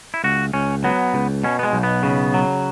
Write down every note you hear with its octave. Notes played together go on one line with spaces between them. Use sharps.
E4
C#2 F#4
C#2 C#4
F#3 B3
C#2
B2 C#4
B3
G#3
B1
B3
C#3
F#3